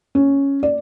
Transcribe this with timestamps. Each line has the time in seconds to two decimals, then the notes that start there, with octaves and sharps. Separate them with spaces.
0.15 C#4
0.63 D5